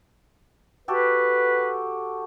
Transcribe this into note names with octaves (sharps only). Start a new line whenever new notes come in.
F#4 G4 A4 B4